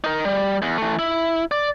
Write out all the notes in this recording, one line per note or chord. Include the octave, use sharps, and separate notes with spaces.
D#4 A#4
G3
E2
E3 A3
E4
D5